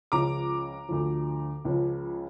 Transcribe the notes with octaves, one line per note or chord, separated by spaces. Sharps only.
C#2 C#3 F3 A#5 D6
D2 D3 F3
C#2 C#3 F3